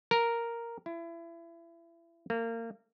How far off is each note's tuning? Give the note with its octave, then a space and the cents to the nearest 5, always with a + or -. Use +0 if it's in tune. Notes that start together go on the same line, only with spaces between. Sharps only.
A#4 +0
E4 +30
A#3 -30